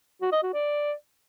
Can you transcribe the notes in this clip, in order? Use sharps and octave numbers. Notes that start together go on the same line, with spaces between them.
F#4
D#5
F#4
D5